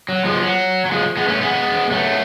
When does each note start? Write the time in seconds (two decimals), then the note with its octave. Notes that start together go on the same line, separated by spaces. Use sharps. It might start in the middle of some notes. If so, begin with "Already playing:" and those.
0.09 F#3
0.25 F3 G#3
0.42 F#3
0.86 F#3
0.92 F3 G#3
1.17 G#3 B3
1.28 A3 C#4
1.41 G#3 B3
1.91 F#3 A3